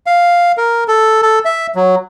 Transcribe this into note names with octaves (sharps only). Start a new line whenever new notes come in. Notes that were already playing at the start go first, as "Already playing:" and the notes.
F5
A#4
A4
A4
E5
F#3